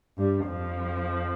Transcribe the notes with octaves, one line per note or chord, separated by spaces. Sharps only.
G2 G3
F2 F3